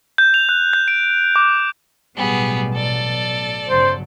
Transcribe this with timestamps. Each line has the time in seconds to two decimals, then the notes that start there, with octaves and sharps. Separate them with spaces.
0.18 G6
0.34 F7
0.49 F#6
0.73 G6
0.88 D7
1.36 D6
2.16 A1 B2 F#3 G3 B3 G#4
2.74 A4 D5
3.68 G1 C#3 F#3 C5